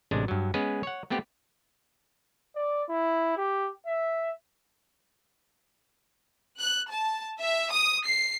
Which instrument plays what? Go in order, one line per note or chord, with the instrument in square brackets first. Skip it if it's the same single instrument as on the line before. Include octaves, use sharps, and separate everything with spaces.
[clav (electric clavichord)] A1 C3 G#3 D4
G2 F#3
G#3 B3 C#4 G#4 B4
C#5 F#5
A3 B3 C4 G4
[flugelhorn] D5
E4
G4
E5
[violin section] F#6
A5
E5
D#6
C7